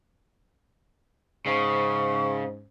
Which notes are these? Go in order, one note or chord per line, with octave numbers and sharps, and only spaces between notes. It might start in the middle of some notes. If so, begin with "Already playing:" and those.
G#2 C#3 C#4 C5 C#6